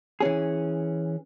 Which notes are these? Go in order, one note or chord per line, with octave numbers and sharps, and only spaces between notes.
E3 C#4 G#4